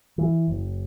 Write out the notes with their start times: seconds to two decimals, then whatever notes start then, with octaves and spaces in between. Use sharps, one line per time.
0.18 E3
0.48 F#1